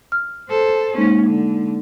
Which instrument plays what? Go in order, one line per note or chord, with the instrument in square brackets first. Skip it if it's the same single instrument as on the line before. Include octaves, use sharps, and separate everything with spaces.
[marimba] F6
[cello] A4 C5
[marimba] G#3 A#3 D#4 [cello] C#4
[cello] D3